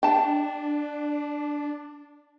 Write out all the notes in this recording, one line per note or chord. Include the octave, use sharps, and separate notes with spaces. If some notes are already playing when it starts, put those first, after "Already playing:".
D4 G5 A5